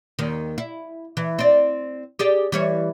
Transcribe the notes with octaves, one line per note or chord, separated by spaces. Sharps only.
D#2 D#3
E4
E3
C4 D5
G4 G#4 D5
E3 G3 C#5